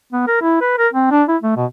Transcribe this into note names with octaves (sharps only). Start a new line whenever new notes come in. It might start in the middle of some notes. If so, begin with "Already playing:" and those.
B3
A#4
E4
B4
A#4
C4
D4
E4
A3
B2